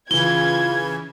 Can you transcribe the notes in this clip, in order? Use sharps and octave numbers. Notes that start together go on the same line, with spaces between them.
C#3 E3 F4 G#6 G7